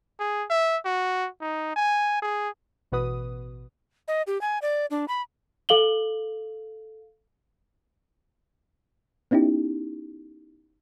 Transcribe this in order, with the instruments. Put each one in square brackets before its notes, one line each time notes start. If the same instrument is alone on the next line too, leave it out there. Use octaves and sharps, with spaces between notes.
[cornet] G#4
E5
F#4
D#4
G#5
G#4
[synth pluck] A1 B2 F#4 B4 D#6
[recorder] D#5
G4
G#5
D5
D4
B5
[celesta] A4 F5 F#7 G7
[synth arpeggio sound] B3 C#4 D#4 E4 G4